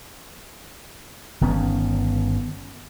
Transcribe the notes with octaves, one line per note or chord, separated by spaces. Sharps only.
G1 D#3 B3 C#4